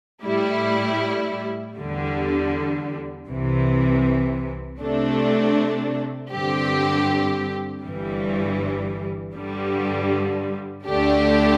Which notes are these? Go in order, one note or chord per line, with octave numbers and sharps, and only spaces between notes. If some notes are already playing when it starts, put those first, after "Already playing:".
A2 G3 E4
E2 D3 G3
C2 C3 E3
C3 A3 D4
G2 D3 C4 G4
G1 G2 E3 G3
G2 D3 G3
D2 D3 A3 D4 G4